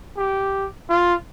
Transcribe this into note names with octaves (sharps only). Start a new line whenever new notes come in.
G4
F4